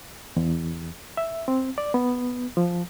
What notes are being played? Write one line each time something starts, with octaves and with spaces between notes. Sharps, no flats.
E2
E5
C4
D5
B3
F3